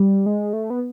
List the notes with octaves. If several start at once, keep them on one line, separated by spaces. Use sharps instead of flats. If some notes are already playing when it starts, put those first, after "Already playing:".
Already playing: G3
G#3
A3
B3